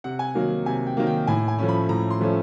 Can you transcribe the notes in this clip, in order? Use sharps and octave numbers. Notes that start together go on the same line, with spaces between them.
C3 F#5
G#5
D#3 F#3 A#3
C3 G#5
G5
D#3 F#3 A#3
G5
A2 G#5
G#5
F3 A3 C#4
B5
A2 A#5
C6
F3 A3 C#4